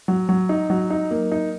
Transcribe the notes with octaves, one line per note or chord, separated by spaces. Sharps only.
F#3
F#3
D#4
F#3
D#4
A#3
D#4